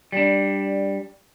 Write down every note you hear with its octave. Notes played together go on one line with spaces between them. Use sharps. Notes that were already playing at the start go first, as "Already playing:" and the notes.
G3 D4